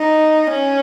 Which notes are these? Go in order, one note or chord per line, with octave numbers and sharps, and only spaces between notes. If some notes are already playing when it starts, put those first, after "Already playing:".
Already playing: D#4
C#4